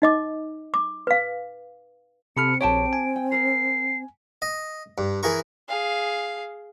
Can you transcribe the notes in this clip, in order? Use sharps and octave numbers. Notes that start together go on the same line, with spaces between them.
D#4 D#5 D6
D6
B4 F5
C3 C4 A4 B5 F6 C#7
A#1 G4 C#5 G5 A5 D7
G#5
G5
G#4 A#4 C7
D#5
G2
E3 E4 G#4 A#4 C#6
G#4 F5